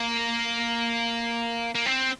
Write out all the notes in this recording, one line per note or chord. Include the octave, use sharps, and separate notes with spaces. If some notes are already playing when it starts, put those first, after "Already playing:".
Already playing: A#3
A#3
C4